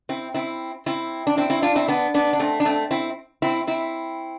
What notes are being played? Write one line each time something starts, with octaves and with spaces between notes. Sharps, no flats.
C4 E4
C4 E4
C4 E4
D4
C4 E4
C4 E4
D4 F4
C4 E4
B3 D4
B3 D4
D4
A3 C4
D4
A3 C4
C4 E4
C4 E4
C4 E4